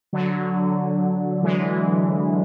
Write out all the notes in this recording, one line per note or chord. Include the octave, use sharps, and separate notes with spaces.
D3 F#3
E3 G#3